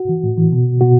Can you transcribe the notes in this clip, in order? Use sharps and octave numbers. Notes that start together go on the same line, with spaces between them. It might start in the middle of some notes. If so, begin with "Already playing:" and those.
Already playing: F#4
E3
A2
E3
B2
B2 F#4